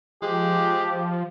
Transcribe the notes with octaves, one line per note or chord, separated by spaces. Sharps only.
F3 G#3 G4